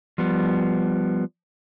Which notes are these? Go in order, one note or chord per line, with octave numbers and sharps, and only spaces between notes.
F3 G3 B3